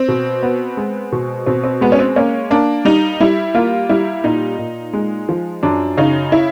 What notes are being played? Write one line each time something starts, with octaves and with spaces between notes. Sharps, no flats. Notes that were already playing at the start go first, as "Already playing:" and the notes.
Already playing: C4
B2
B3
G#3
B2
B2 C4
C4
G#3 B3
C#4
C4
A#3 C#4
A#3 D4
G3 D#4
G3 E4
A#3 F4
G3 E4
A#2 D#4
A#2
G#3
F3
F#2 D4
C#3 D#4
E4